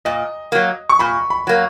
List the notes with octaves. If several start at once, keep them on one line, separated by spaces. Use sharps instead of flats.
A#2 D#5
F#3 A#3
C#6
A#2 B5
B5
F#3 A#3